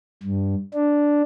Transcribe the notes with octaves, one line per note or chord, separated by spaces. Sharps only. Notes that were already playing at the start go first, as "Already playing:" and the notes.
G2
D4